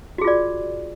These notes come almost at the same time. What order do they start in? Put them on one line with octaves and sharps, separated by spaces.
F#4 G#4 F4 D5